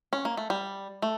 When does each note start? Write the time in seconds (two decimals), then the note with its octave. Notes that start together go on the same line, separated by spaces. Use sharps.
0.13 C#4
0.25 A#3
0.37 A3
0.50 G3
1.02 A3